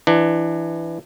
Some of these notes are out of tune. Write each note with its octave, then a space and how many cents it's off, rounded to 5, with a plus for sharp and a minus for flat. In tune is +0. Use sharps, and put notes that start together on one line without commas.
E3 +15 D4 +25